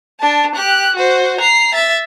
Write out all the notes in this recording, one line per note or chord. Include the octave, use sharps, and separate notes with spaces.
D4 A5
G4 F#6
F#4 C5
A#5 C7
E5 A6